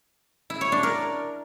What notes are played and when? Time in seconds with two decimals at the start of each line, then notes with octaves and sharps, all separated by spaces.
0.50 E4
0.61 C#5
0.72 D4
0.83 A#4